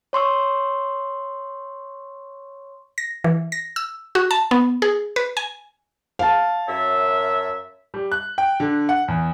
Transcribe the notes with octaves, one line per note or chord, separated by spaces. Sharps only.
C#5 C6 C#6 E6
A#6
E3
A#6
E6
F#4
A5
B3
G#4
B4
G#5
F5 A5
F#2 C#5 E5
G3
F#6
G5
D3
F#5
E2